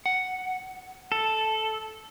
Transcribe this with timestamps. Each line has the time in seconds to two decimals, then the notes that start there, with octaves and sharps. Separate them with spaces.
0.06 F#5
1.12 A4